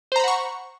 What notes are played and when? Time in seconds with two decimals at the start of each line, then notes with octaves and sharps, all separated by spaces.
0.12 C5
0.16 A#5
0.20 B5
0.24 F#5
0.28 C#6